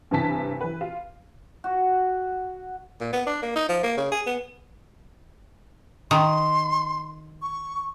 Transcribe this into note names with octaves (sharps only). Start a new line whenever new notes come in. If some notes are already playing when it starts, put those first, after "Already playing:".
G2 C3 E3 G#5 A5 B6
E3 B4
F4
F#4
A#2
B3
D4
A#3
D#4
F3
A#3
C#3
G#4
B3
D#3 C6
C#6